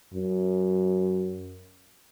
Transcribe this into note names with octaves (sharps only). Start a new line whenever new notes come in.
F#2